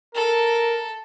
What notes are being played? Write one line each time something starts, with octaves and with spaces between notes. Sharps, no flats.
A4 A#4